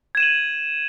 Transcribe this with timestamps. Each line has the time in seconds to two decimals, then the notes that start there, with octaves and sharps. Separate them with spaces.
0.15 G#6
0.17 E7
0.20 D#7
0.23 F#7